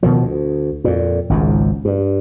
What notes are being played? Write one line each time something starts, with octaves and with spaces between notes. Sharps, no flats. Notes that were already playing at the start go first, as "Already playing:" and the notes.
B2 D#3 F3
D2
F2 A#2
G#1 C#2 G#2
G2